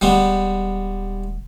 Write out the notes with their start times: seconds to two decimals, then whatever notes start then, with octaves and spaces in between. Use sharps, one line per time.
0.01 D#1 G3 G#3 B3